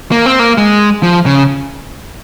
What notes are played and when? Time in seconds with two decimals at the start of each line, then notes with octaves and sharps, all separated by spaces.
0.12 A#3
0.26 C4
0.39 A#3
0.57 G#3
1.03 F3
1.26 C#3